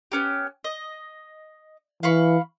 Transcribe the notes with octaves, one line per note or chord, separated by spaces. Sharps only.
B3 C#4 G4
D#5
E3 F5 B5 C#6